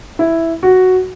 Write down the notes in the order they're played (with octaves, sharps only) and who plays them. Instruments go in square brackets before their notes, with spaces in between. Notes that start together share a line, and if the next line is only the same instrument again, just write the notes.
[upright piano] E4
F#4